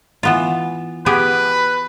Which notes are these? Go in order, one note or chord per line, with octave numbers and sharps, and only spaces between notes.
E3 B3 F4
B3 G4 G#4 B4